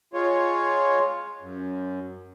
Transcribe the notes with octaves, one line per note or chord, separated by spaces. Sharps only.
G#3 F4 C#5
F#2